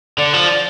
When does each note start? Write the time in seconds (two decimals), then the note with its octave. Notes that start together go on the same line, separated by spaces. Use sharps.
0.18 D3 D5
0.33 F3